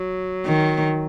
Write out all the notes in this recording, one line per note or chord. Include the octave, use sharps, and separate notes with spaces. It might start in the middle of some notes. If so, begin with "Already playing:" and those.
Already playing: F#3
D#3